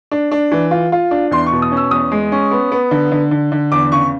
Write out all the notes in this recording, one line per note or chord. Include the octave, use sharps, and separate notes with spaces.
D4
D4
E3
F4
F4
D4
E2 C6
C#6
B2
D#6
C#4
E6
E2 D#6
G#3
C#4
B3
B3
D3
D3
D3
D3
E2 D6
C#3 C#6